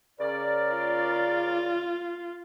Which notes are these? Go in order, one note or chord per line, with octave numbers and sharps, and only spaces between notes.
C#3 A#4 D5
F4